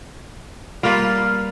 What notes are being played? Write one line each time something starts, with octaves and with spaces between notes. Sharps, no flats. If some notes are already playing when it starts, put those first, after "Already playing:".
G3 A#3 F4 B4